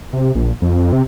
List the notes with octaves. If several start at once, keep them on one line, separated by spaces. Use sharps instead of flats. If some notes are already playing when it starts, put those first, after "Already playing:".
C3
A#1
F2
C3